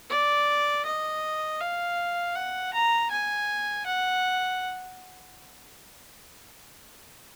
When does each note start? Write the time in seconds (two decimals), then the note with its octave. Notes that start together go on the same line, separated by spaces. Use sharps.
0.10 D5
0.86 D#5
1.61 F5
2.36 F#5
2.74 A#5
3.11 G#5
3.86 F#5